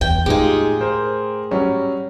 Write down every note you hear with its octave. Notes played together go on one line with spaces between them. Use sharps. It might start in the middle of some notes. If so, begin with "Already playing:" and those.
E2 G5
A2 G#3 D#4 F4 G4 G#4
A#4 C5
F#3 G3 C#4